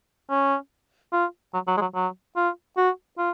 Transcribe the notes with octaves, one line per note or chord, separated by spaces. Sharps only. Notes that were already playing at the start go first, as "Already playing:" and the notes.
C#4
F4
F#3
F#3
G#3
F#3
F#3
F4
F#4
F4